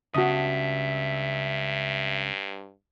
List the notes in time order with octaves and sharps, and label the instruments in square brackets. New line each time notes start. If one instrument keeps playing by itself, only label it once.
[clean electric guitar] C#2 C#3 A5 [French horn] G2 [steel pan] F#4 D#6 [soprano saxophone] E5